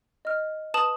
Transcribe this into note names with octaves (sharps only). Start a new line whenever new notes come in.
D#5 F6
B4 A5 D#6 E7 F#7